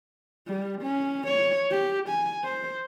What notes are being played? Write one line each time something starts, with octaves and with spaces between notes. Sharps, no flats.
G3
C#4
C#5
G4
G#5
C5